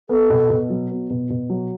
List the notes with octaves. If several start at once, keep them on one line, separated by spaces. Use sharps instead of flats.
B3 A4
B2
B2
F#3
B3
B2
B2
F#3